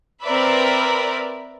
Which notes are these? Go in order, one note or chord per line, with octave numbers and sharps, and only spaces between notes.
C4 A#4 B4 D5 E5 B5